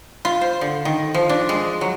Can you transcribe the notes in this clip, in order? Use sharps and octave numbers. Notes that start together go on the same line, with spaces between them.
F4
C5
D3
D#3
F3
D4
G#3
F#3